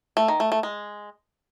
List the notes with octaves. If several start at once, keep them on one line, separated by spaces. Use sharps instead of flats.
A3
D#3
A3
A3
G#3